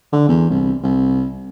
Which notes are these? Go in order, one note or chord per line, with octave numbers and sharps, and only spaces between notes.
D3
E2
C2
C2